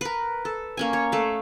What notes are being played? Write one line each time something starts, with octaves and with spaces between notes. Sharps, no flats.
A#4 B4
A4
A#3 C#4 G#5
C#5
A3 F5